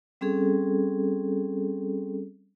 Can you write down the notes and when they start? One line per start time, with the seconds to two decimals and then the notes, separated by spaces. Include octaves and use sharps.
0.21 G3 C4 C#4 G#4 A4